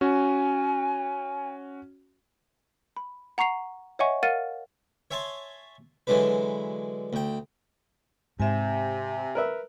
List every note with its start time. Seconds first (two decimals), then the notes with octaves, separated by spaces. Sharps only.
0.01 C#4 F#4 G#5
2.96 B5
3.38 F#5 A#5 C#6 C7 F7
3.99 C#5 D#5 E5 F#5 G#5 C#6
4.23 A#4 F5 F#5 F6 A6 D#7
5.11 C#5 E5 G#5 A5 C6
6.07 D3 E3 F#3 G#3 D4 B4
7.13 D2 G5
8.40 G#2 C3 E5 G#5
9.35 A#4 B4 E5